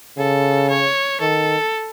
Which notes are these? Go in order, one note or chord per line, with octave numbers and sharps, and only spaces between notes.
C#3 A4
C#5
D#3 A4